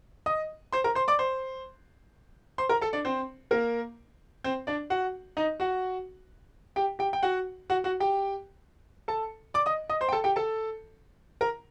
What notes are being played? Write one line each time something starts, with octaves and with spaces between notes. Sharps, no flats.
D#5 D#6
C5 C6
A#4 A#5
C5 C6
D5 D6
C5 C6
C5 C6
A#4 A#5
A4 A5
D4 D5
C4 C5
A#3 A#4
C4 C5
D4 D5
F#4 F#5
D#4 D#5
F#4 F#5
G4 G5
G4 G5
G5
F#4 F#5
F#4 F#5
F#4 F#5
G4 G5
A4 A5
D5 D6
D#5 D#6
D#5 D#6
C5 C6
G5
A4 A5
G4 G5
A4 A5
A#4 A#5